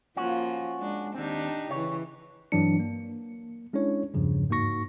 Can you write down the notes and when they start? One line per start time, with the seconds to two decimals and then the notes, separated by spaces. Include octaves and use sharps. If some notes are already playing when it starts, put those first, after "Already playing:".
0.16 F3 A#3 C#4 F4 F#4
0.79 G#3 D4
1.14 D#2 C4 D4 D#4 G4
1.71 C#3 E3 C#5
2.52 G2 E3 F#3 C4 D4 C#7
2.80 A#3
3.73 G#3 C#4 D4 E4 C#5
4.14 E2 G2 C#3 F3
4.50 G#2 A#3 D#4 F#4 C#6 A#6